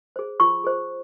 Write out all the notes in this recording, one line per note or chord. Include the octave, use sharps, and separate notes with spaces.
G#4 C5
F4 C#6
G#4 C5